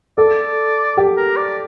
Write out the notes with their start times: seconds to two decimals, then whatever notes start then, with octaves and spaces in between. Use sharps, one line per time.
0.18 A4 D5
0.97 G4
1.17 A#4
1.37 D5